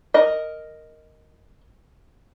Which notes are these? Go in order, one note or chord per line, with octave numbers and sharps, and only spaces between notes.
A#4 D#5